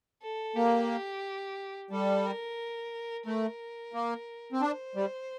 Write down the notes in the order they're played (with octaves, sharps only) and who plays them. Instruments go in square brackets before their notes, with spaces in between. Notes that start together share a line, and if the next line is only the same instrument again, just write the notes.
[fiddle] A4
[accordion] A#3 [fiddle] G4
[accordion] G3 [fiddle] A4
[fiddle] A#4
[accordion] A3 [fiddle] A#4
[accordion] A#3
C4
[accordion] D4 [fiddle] C5
[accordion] G3